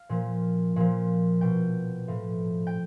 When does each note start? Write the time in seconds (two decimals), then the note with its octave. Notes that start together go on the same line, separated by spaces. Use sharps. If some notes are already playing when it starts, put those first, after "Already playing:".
Already playing: F5
0.09 A#2 F3
0.76 A#2 F3
1.41 B2 G5
2.08 A2 F3
2.67 G5